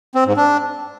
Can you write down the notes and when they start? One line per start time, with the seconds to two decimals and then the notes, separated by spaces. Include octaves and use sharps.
0.15 C4
0.26 G#2
0.37 D4